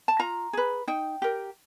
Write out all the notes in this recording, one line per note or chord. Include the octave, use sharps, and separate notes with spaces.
A5
F4 A#5
G#4 B4
D#4 G5
G4 A#4